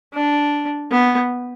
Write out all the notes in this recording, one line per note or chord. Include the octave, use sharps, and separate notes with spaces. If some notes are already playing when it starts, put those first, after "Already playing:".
D4
B3